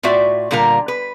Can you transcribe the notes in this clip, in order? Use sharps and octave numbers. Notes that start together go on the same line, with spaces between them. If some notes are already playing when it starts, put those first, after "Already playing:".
A2 F4 F#4 D5 E5
A#2 D3 G3 F4 A#4
B4